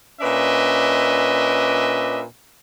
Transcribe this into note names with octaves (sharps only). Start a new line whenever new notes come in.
A#2 C#4 D4 B4 D#5 E5